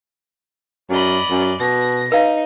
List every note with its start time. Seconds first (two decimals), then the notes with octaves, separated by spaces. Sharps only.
0.90 F#2 D5 D#5 B5
1.31 F#2
1.60 B2 A#6
2.12 D#4 B4 F5